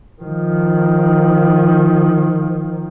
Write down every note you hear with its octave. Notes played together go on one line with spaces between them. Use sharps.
D#3 F3